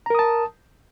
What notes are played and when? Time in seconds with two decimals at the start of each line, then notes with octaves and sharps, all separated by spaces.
0.06 A#5
0.10 A#4
0.15 D#6
0.19 A5